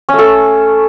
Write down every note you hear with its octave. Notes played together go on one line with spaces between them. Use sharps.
A3 C#4 A4